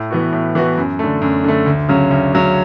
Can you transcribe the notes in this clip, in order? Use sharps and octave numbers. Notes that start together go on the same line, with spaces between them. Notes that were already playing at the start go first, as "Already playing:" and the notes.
Already playing: A2
E3 B3 F#4
A2
E3 B3 F#4
F#2
D3 A3
F#2
D3 A3
D2
C#3 F#3 C#4
D2
C#3 F#3 C#4